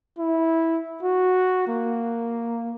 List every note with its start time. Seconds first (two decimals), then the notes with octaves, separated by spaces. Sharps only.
0.19 E4
1.03 F#4
1.68 A#3